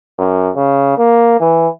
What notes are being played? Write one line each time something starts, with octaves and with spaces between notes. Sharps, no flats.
F#2
C#3
A#3
E3